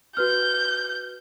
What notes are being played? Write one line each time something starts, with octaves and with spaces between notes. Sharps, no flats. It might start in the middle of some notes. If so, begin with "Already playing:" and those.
F#4 B4 F6 G6